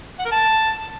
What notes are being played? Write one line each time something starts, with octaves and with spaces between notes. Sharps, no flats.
F#5
A#4
A5